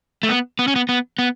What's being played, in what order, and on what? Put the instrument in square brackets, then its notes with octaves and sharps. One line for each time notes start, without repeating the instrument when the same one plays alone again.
[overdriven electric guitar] A3
B3
B3
C#4
B3
B3
B3